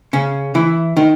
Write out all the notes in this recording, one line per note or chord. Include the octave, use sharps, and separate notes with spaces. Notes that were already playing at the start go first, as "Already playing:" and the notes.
C#3 C#4
E3 E4
D#3 D#4